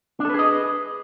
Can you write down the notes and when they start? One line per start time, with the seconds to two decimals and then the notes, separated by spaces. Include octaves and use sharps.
0.20 D4
0.25 A4
0.30 B4
0.34 G#4
0.39 D#5